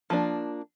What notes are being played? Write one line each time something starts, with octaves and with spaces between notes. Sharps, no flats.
F3 A#3 D4